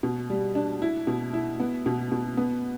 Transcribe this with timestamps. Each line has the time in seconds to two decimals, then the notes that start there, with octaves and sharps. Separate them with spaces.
0.03 B2
0.30 G3
0.55 D4
0.82 E4
1.07 B2
1.33 E4
1.60 B3
1.86 B2
2.12 B2
2.37 B3